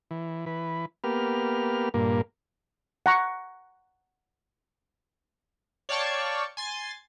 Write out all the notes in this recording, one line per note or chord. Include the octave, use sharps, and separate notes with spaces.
E3
E3 B4
A#3 B3 G4 F6
G2 A#2 A#3
F#5 A#5 C#6
C#5 D5 F5 G5 A5 C#6
G#5 C6 A6